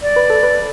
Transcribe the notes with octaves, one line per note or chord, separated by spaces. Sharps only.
D5
B4
A4
B4